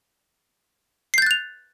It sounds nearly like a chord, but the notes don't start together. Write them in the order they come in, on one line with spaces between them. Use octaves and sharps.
C7 G6 A6 F#6 F7